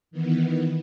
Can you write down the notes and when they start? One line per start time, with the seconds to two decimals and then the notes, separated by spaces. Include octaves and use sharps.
0.11 D#3 E3 B3